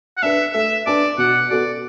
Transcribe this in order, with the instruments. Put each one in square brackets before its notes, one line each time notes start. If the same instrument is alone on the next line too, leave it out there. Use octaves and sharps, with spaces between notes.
[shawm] F#5
[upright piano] D4 B4 [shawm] E5
[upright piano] A3 [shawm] E5
[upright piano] D4 B4 [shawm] D5
[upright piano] B2 [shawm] F#5
[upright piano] B3 F#4 A4 [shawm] D5